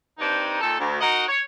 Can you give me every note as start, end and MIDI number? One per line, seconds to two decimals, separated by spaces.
0.19 0.58 43
0.19 0.58 60
0.19 0.58 62
0.19 0.58 63
0.60 0.76 46
0.60 0.76 51
0.60 0.76 69
0.79 0.96 38
1.01 1.23 63
1.01 1.23 66
1.01 1.23 70
1.01 1.23 75
1.01 1.23 78
1.28 1.40 73